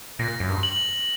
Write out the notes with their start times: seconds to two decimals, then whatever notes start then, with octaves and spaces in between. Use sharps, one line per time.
0.19 A#2 A#6
0.40 F#2
0.49 G2
0.63 F#7